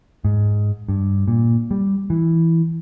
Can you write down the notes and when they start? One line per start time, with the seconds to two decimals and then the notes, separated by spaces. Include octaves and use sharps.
0.25 G#2
0.89 G2
1.28 A#2
1.71 G3
2.10 E3